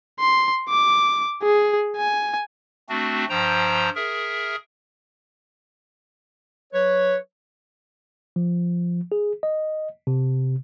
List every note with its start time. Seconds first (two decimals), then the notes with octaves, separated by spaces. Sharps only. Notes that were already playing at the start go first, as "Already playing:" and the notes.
0.20 C6
0.70 D6
1.43 G#4
1.97 G#5
2.89 A3 C4 D4 F#4
3.30 G2 F3 C5 G5 A#5
3.95 G#4 A#4 E5
6.73 F#3 B4 C#5
8.36 F3
9.12 G#4
9.43 D#5
10.07 C3